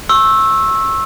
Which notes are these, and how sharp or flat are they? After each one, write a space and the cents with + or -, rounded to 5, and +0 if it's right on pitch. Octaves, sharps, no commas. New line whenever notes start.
C#6 -35 E6 -5